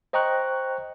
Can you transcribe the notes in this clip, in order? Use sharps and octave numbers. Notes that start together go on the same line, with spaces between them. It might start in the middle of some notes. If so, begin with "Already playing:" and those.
C5 D#5 G5 A#5 C#6 F#6